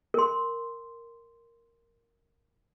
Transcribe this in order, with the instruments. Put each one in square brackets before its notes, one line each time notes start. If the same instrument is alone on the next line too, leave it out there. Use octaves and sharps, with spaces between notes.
[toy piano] A#4 C6